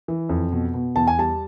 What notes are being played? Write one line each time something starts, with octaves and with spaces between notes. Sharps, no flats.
E3
F2
B2
B2
E2 A5
G#5
G3 A5